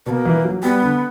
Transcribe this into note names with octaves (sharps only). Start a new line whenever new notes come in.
B2 A#3 B3
E3
F#3
G3 B3
D3